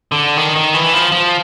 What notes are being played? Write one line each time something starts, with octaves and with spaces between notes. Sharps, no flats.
D3
D#3
D#3
E3
F3
F3